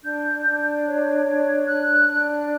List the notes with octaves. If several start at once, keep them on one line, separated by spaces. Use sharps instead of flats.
D4 G6
D4
C#5
D4
D4 F#6
D4